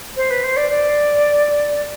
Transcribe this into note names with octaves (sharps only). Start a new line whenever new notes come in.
C5
B4
C5
D5
D5